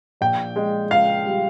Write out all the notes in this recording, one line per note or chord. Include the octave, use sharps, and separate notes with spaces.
A#1 G5
G#3
C#2 F5
G3